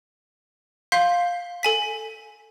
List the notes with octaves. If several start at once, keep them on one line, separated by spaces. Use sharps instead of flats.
F5 C6 G6 B6
A4 G#5 B6